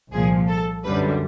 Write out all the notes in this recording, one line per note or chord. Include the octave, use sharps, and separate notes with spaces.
C2 A#2 F3 G#4
A4
F#2 D3 G3 B4